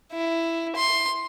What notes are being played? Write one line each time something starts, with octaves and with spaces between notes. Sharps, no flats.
E4
C6